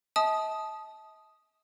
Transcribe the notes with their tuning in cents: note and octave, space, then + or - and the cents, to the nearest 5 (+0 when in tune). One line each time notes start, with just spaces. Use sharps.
D#5 +45 A5 -20 D#6 +0